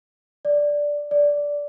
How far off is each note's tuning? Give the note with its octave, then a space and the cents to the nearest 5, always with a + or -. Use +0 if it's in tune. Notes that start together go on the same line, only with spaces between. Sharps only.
D5 -5
D5 -10